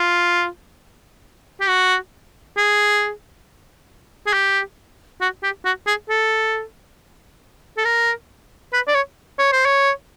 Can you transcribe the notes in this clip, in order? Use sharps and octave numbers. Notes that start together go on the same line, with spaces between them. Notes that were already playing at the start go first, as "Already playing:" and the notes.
Already playing: F4
G4
F#4
G#4
G#4
G4
F#4
G4
F#4
G#4
A4
A4
A#4
B4
D5
C#5
C#5
C5
C#5